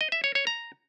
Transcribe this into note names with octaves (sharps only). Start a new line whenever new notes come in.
D#5
E5
C#5
C#5
A#5